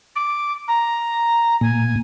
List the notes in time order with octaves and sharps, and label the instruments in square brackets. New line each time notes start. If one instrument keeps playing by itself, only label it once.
[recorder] D6
A#5
[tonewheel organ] A#2 [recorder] G#5